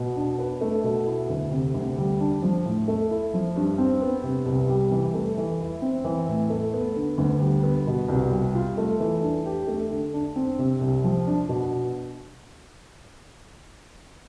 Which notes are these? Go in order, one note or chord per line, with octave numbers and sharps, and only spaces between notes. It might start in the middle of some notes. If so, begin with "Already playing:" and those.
Already playing: B2
D4
B4
A3
B2
E4
D2
C3
D2
G3
D4
F3
A2
A3
E4
F3
G2
C4
B3
C3
C2
G3
E3
A3
E3
E4
C4
E3
A2
A3
B3
D3
D2
G3
B3
B2
C2
G3
F4
A3
E3
D4
G4
A3
D3
D4
C4
C3
C2
F3
D4
B2